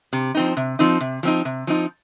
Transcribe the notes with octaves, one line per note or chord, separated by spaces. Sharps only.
C3
F3 C4 D#4
C3
F3 C4 D#4
C3
F3 C4 D#4
C3
F3 C4 D#4